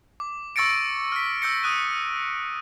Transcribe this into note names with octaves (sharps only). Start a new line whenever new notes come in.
D6
C#6 E6 A6 A#6 C#7 D7
F6 B6
E6 G6 A#6 C#7
D#6 F#6 D#7